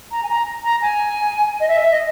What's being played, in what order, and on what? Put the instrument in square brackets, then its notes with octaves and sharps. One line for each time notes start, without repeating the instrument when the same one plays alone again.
[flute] A#5
G#5
A#5
A#5
G#5
D#5
E5
E5
D#5